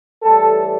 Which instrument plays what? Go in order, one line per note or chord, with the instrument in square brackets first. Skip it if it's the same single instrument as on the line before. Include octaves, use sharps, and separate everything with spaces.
[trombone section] A2 E3 G3 A4